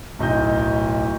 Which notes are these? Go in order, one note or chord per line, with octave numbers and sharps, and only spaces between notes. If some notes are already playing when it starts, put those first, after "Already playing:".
D1 B1 D#5 G6